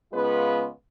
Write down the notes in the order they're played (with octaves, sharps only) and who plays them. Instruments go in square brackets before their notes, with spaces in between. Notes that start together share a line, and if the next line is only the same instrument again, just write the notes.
[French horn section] C#3 G#3 B3 F4 B4